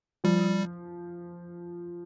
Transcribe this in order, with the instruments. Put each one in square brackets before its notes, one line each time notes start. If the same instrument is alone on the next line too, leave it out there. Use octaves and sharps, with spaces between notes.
[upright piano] F3 [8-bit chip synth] G3